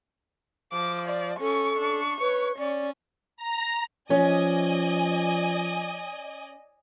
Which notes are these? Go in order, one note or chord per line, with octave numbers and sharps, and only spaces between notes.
F3 D6
D5
C#4 A4 C#6
D4
B4 C#5
C#4 D5
A#5
F3 C#4 D5 D#5 G#5